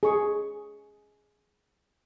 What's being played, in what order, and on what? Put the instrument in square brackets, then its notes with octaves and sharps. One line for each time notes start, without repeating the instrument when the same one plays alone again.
[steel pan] G#4 C#6